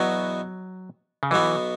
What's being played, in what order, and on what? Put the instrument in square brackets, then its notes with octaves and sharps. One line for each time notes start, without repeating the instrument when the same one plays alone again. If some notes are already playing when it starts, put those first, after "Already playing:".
Already playing: [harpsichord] E2 B2 B3 F#4 [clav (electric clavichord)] F#3
[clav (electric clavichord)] C#3
[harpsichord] B1 B2 B3 F#4 [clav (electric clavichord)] E3